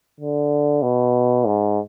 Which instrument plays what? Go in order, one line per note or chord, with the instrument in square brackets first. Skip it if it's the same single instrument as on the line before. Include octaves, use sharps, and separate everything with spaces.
[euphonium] D3
B2
G#2